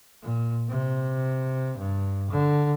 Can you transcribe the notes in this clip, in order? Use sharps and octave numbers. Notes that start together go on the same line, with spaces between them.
A#2
C3
G2
D3